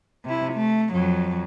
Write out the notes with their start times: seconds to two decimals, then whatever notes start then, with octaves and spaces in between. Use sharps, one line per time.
0.25 C3 E4
0.53 A3
0.93 F2 F#3